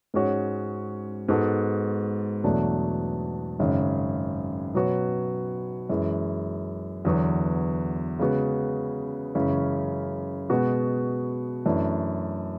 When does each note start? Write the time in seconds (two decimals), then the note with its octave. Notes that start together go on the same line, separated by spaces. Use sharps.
0.14 G#2 G#3 C#4 F#4 C#5
1.29 G#2 G#3 B3 F#4 A4
2.44 E2 B2 F#3 A3 D4
3.59 G#1 F#2 C#3 G#3
4.74 B2 F#3 B3 F#4 C#5
5.89 F#2 E3 G#3
7.05 E2 D3 F#3 B3 F#4
8.19 C#3 G#3 B3 F#4
9.35 F#2 C#3 E3 G#3 C#4
10.50 B2 G#3 B3 F#4
11.65 F#2 E3 A3 D4